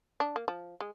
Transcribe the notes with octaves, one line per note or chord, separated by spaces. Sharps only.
D4
A#3
F3
G#3